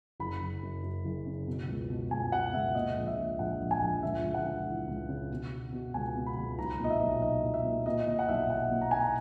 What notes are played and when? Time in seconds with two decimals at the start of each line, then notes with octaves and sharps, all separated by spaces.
0.20 F#1 B5
0.41 F#1
0.63 F#2
0.83 F#2
1.05 F#1
1.26 C#3
1.47 B2
1.69 C#2
1.90 B2
2.11 C#2 G#5
2.32 B2 F#5
2.54 C#2 E5
2.75 A#2 D#5
2.96 A#1
3.07 E5
3.18 A#2
3.39 A#1 F#5
3.60 A#1
3.71 G#5
3.82 A#1
4.03 C#2 E5
4.24 C#2
4.34 F#5
4.45 C#2
4.67 E3
4.88 C#2
5.09 C#3
5.31 B2
5.52 B2
5.72 B2
5.94 C#2 G#5
6.16 B2
6.26 B5
6.37 C#2
6.58 B1 A#5
6.79 A#2 D#5
6.90 E5
7.01 B1
7.22 B1 D#5
7.44 B1
7.54 E5
7.65 A#2
7.86 A#2 D#5
8.07 A#2 D#5
8.19 F#5
8.29 B1 E5
8.50 B1 F#5
8.71 A#2
8.81 A#5
8.91 A#2 G#5
9.00 A#5